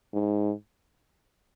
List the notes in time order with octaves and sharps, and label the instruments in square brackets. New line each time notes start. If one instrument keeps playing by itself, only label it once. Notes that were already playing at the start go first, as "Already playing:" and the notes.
[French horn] G#2